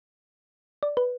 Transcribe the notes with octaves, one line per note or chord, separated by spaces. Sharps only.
D5
B4